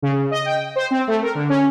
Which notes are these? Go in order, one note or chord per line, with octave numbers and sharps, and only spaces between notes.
C#3
D#5
G5
C5
C4
A3
A#4
D3
C#4